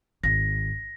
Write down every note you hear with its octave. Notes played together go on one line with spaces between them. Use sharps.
G#1 A#6